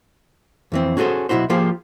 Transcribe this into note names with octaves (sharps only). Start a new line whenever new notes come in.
F2 E3 C4
C#4 F#4 G#4 A4 C5
B1 G2 E4 F#4 C5
F3 A#3 F4 G4 G#4 C5